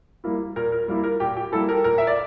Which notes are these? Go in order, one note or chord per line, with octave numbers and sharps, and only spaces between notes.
G3 A#3 E4
A#2 A#4
A#4
G3 A#3 E4
A#4
A#2 G4
G4
G3 A#3 E4 A4
A#4
A#2 A#4
E5
D5